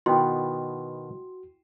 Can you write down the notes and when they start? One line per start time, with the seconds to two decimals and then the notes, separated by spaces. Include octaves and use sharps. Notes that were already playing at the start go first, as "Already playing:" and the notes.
0.06 B2 D#3 B3 E4 F#4 G5 C6